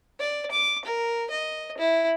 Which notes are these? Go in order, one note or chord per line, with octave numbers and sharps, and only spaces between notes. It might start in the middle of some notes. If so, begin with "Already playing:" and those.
D5
D6
A#4
D#5
E4